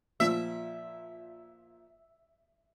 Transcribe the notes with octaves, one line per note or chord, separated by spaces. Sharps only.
A#2 F3 E5